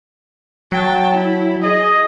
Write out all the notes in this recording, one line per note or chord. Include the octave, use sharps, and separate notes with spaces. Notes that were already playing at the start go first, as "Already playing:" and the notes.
F#3 G5 A5
E4
G#4 D#5